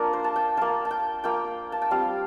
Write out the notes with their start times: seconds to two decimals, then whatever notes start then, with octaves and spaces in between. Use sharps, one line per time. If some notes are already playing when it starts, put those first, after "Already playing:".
Already playing: A#3 D4 F4 A#4
0.13 C5
0.24 A5
0.36 G5
0.57 A#3 F4 A5
0.85 A5
0.91 G5
1.24 A#3 F4 G5
1.72 A5
1.82 G5
1.91 G3 C4 F4 F5